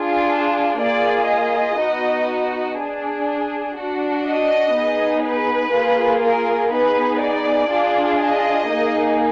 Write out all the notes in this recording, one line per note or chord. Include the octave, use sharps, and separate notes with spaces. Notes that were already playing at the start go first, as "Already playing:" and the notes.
Already playing: D4 F4 G#4
A#3 F4 G#4 D5
D#5
B3 D#4 F#4
D4 G#4
D4 F#4
D#5
B3 D#4 G#4
B4
A#3 F4 G#4
A#4
B3 D#4 G#4 B4
D5
D4 F4 G#4
D#5
A#3 D#4 G#4